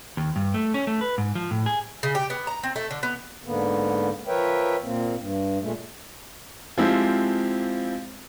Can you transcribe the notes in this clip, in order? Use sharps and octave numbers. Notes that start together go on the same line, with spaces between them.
D#2
G2
A3
C#4
A3
B4
G#2
F3
A2
G#4
C#3
G4
B3
A#5
C4
A3
D3
B3
G#2 D3 A#3 B3
F3 A#4 B4 C#5 E5 G5
A#2 A#3 C4
G2
A#2 G#3 A3
F3 G#3 C4 E4 F4 G4